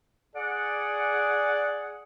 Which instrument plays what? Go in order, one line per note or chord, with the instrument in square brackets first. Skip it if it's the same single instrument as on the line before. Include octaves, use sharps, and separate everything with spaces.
[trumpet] G#4 [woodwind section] D5 F#5